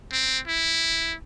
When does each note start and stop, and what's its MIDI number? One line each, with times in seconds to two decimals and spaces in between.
0.12 0.39 60
0.47 1.15 64